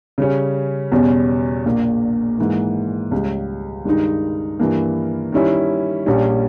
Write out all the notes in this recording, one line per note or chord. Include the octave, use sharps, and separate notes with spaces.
C#3 G3 C#4
E2 B2 G3 C#4
A#1 A#2 A#3
G#2 E3 A#3
C#2 C#3 G3
G2 D#3 G#3 D#4
G2 E3 A#3
D#3 G3 C#4 E4
A#1 A#2 G3 C#4